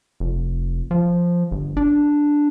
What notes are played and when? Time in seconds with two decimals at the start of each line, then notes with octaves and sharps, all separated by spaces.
0.20 F1
0.91 F3
1.51 G1
1.77 D4